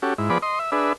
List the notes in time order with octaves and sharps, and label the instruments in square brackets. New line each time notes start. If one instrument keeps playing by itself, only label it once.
[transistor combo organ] C#4 F#4 G4 A4
G#2 E4
F3 B3 G#4 D5 B5
D#5 C6
E5
D4 G#4 B4 E5